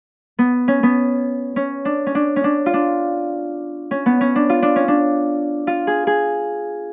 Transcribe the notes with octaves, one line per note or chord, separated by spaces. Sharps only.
B3
C#4
B3
C#4
D4
C#4
D4
C#4
D4
F4
D4
C#4
B3
C#4
D4
F4
D4
C#4
D4
F4
G#4
G#4